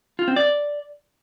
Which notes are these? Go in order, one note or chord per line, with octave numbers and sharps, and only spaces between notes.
F4
C4
D5